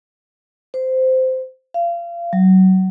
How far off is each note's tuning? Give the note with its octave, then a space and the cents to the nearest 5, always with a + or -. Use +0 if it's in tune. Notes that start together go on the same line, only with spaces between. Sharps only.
C5 -15
F5 -30
F#3 +25